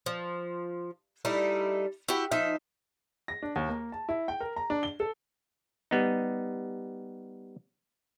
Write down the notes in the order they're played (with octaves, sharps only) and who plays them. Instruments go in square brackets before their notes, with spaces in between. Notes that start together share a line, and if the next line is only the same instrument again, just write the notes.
[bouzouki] F3
G3 A3 D#4 E4
E4 F#4 G4
F3 D#4 E5
[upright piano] A#6
D4
D#2
A#3
A5
E4
G5
A#4
A#5
D4
G7
A4
[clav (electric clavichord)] G3 B3 D#4